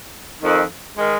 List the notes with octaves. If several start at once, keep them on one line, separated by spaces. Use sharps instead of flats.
F2 D#3
D#3 G#3